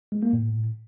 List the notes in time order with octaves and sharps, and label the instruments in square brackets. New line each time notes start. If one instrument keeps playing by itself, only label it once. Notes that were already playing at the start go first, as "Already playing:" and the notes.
[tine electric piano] G#3
A#3
A2